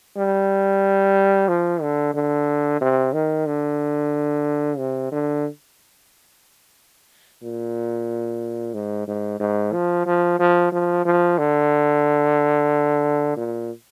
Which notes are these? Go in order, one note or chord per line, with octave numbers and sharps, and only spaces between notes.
G3
F3
D3
D3
C3
D#3
D3
C3
D3
A#2
G#2
G#2
G#2
F3
F3
F3
F3
F3
D3
A#2